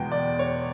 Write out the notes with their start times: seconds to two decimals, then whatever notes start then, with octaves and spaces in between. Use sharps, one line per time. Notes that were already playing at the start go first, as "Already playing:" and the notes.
Already playing: E2 B2 G#3 B3 G5
0.12 D5
0.39 C#5